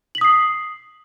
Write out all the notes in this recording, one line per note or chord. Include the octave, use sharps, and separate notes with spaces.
D#6 B6 C7 F#7